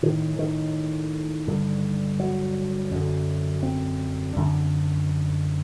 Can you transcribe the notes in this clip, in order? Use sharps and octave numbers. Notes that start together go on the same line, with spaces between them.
A2 D#3
D#3
G2 D3
F#3
F#2 D3
C4
F#2 D3